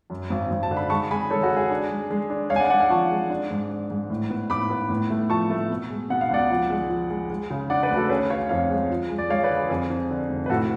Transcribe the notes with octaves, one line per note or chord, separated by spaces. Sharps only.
F#2
G#1
G#1
A5
D3
B5
G#3 A5 C#6
G#3 G#5 B5
G#3 A4 C#5
F#4
G#3
G#4
D4
G#3
G#3
D4
G#3 C#5 F5
G#5
D5 F#5
G#3 D5 F#5
F5 G#5
F3 A5 C#6
G#3
D4
G#2
D4
G#2
A2
B3
A2 B5 D6
B3
A2
A3
F3 A5 C#6
A3
B2
G#3
B2 F#5
F5
C#2 D5 F#5
F3
G#3
F3
G#3
G#3
C#3
D4 D5 F#5
B4 D5
D2
F#4 A4
C#4 G#4 B4
C#4 C#5 F5
F2 C#5 F5
G#3
F3
G#3
D5
G#3 C#5 F5
B4 D5
D3
G#4
F2 G#4
F2
D3
F1
B4
A2 F#4 A4